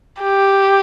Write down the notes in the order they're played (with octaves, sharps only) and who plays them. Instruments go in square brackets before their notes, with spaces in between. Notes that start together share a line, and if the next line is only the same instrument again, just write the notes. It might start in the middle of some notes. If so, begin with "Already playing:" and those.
[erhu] G4